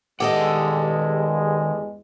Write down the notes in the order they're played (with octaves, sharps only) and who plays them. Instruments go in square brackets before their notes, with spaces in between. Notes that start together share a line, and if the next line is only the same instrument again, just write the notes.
[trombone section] E2 G2 G#3 [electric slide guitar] D#3 F#5 [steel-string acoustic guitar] G4 A4 D#5